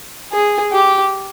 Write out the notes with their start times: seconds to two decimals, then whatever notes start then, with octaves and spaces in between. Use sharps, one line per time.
0.32 G#4
0.72 G4